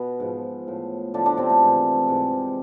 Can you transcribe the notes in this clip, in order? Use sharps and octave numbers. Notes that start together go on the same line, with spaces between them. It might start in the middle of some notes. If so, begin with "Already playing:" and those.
Already playing: B2 B3
G#2 F3
A2 F3
A2 D3 F3 D4
D3 D4
C3 C4
A3
G#2 E3
G#2 E3